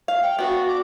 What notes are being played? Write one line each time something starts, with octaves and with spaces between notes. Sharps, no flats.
F5
G5
B3 D4 F#4
D6